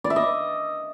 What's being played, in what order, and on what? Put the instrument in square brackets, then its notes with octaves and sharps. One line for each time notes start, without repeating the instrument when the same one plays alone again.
[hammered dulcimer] D5
E5
D#5